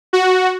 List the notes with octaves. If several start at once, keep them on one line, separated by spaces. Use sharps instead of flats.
F#4